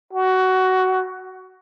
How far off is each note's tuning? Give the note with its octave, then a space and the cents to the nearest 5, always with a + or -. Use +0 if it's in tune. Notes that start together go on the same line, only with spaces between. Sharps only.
F#4 +15